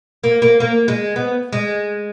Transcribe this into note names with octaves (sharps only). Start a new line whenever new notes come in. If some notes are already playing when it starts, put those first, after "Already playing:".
A#3
A#3
A#3
G#3
B3
G#3